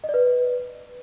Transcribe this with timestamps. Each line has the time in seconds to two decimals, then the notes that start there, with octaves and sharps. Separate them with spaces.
0.04 D#5
0.09 D5
0.14 B4